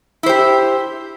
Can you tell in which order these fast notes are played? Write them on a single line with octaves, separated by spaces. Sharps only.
E4 C5 G4